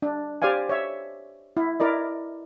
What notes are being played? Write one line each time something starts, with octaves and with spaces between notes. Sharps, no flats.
D4
G4 C5 D5 F5 G#5
C#5 E5
E4
E4 A#4 D5 D#5